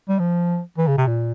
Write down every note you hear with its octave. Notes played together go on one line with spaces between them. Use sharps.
G3
F3
E3
C#3
C3
A#2